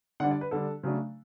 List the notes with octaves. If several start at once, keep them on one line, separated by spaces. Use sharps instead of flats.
D3 G3 D4 F#5
D5
B4
D3 G3 D4 A4
C#3 F#3 A3 D4